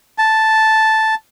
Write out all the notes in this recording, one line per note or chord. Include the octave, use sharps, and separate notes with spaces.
A5